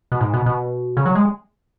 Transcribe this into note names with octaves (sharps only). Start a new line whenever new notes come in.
B2
G#2
B2
B2
C#3
F#3
G#3